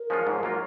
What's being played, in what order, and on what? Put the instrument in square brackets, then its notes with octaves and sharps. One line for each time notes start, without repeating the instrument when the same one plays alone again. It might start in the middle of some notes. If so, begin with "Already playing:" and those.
Already playing: [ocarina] A#4
[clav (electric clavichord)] F3 G#3 C#4 F4
G#2
F#3 A#3 F4